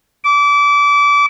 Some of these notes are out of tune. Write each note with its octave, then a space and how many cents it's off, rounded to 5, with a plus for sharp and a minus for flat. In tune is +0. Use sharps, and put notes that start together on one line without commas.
D6 -25